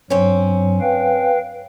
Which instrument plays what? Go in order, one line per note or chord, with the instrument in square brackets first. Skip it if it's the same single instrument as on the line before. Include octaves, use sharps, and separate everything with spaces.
[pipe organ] G2 F#3 [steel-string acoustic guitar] C4 C#4
[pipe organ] B4 F5 G5